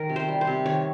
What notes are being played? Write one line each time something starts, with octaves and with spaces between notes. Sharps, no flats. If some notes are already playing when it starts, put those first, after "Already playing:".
Already playing: D#3 A#4
C3
C5
G3
C5
C3
D#3 C#5